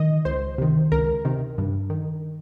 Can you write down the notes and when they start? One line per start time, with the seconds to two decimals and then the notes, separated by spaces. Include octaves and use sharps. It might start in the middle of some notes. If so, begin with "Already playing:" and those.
Already playing: D#3 D#5
0.25 C#2 C5
0.58 C3 D#3
0.92 C#2 A#4
1.25 C3 D#3
1.58 G2
1.90 D#3